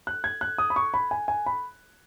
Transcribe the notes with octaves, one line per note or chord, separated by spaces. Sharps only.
F#6
G#6
F#6
D#6
B5
C#6
B5
G#5
G#5
B5